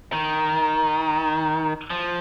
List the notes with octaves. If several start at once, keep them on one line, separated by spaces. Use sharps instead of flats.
D#3
F3